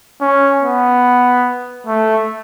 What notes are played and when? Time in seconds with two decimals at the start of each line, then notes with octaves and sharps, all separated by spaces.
0.21 C#4
0.63 B3
1.87 A3